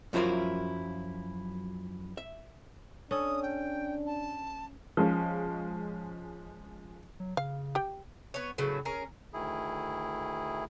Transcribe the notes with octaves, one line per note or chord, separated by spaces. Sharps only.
F#2 F3 F#3 E4 F4 A#4
E5
C#4 D4 A4 D#6
G5
A5
F3 G#3 C#4
F#3
C#3 F5
G4 G5
B3 C#5
A2 C#3 F#3 B3
C#4 G#4 A#4
D2 D#3 E4 G#4